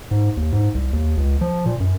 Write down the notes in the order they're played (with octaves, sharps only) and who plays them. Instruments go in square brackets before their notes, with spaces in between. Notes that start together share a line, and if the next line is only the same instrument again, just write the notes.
[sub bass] G#2
D#2
G#2
C2
D#2
C#2
F3
A#2
F#2